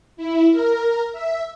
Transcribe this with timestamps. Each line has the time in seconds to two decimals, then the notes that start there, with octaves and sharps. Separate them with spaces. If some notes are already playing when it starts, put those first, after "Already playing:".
0.17 E4
0.51 A#4
1.12 E5